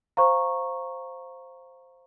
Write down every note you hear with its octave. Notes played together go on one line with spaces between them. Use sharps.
C5 F5 A#5 C#6